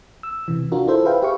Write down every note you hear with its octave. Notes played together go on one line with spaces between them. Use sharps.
E6
C3 E3
D4 F4 F#4 A#4
E4 A4 C5 E5
G#4 B4 C5 E5 F5 G5
G4 B4 E5 F5 C#6